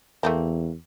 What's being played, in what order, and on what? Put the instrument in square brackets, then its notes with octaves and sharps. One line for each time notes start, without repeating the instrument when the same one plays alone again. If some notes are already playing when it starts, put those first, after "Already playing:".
[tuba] E2 [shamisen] A3 A#3 C4